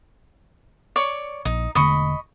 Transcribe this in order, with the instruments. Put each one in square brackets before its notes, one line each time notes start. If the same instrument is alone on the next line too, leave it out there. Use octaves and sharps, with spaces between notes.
[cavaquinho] C#5 D5 C#6
[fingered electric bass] A#1 [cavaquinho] D#4
[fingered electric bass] E1 D3 A3 [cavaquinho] D#5 B5 C#6